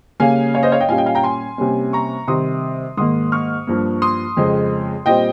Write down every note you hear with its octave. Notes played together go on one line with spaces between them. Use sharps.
C#3 G3 A#3 C#4 F5 G#5
C#5 F5
C5 D#5
C#5 F5
D#5 G5
A#2 G3 C#4 F5 G#5
D#5 G5
F5 G#5
G5 A#5
G#5 C6
C3 G3 A#3 C#4
A#5 C#6
C3 D#3 G3 C6 D#6
G#2 D#3 A#3 C6 D#6
C#6 F6
G2 F3 A#3
C6 D#6
F2 C#3 G#3 C4
A#2 G3 C4 D#5 G5